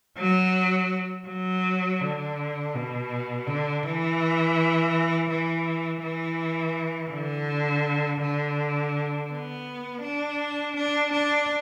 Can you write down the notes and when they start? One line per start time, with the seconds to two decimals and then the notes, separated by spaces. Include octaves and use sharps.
0.18 F#3
1.28 F#3
2.00 D3
2.74 B2
3.46 D3
3.83 E3
5.29 E3
6.02 E3
7.11 D3
8.21 D3
9.30 B3
10.02 D4
10.76 D4
11.12 D4